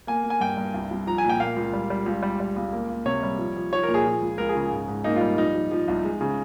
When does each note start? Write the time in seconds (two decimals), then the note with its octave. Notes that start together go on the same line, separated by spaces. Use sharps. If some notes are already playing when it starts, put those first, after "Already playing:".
0.07 A#3 G#5
0.24 A#3
0.30 G#5
0.40 G2 G5
0.57 G2
0.74 C2
0.91 C2
1.07 F3 A#5
1.18 G#5
1.24 A#2
1.29 G5
1.40 A#3 F5
1.56 C#2
1.73 G3
1.90 G3
2.06 C#2
2.23 G3
2.40 G3
2.56 C#2
2.72 A#3
2.90 A#3
3.06 C3 C#5
3.23 G3
3.39 F3
3.56 F3
3.73 F3 C#5
3.83 A#2 A#4
3.94 G#4
4.06 F3
4.21 C#2
4.38 C#2 A#4
4.49 G#4
4.55 C#3
4.72 G#2
4.88 G#2
5.04 A#3 D#4
5.16 F4
5.21 G3
5.38 F3 D#4
5.55 F3
5.71 F3
5.88 C2
6.05 G#3
6.21 C#3